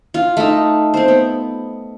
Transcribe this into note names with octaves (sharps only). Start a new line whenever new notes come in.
F4
A3 D#4
C4 C5
B3